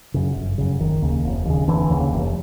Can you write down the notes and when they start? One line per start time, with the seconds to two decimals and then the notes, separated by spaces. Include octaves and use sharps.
0.14 F#2 C#3
0.36 G1
0.58 F#2 C#3
0.80 F1 D#3
1.02 D#2 C#3
1.25 F1
1.45 D#2 C#3
1.68 F1 D3 E3
1.90 D#2 C#3
2.12 F1